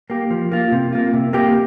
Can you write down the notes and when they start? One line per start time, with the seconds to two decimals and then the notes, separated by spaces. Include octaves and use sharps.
0.10 A#3 G4
0.30 F3
0.52 A#3 F4
0.72 C3
0.93 A#3 F4
1.13 C3
1.33 A#3 G4